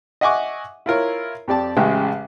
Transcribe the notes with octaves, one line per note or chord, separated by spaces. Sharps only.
D#5 E5 F#5 G#5 C#6 D6
E4 F4 A#4 C#5
F2 G4 D5 A5
A1 C#3 G#3 E5 G5